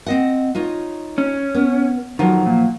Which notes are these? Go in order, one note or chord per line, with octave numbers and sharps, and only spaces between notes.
C4 D#5 F#5
D#4 F4 C#5
C#4
B3
F2 D#3 F3 F#3 F4
A#2